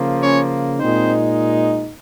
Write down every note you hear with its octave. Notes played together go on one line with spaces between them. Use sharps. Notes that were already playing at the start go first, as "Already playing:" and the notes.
Already playing: C#3 F3 A#3
C#4 C#5
A#2 G#3 C4 D#4 C5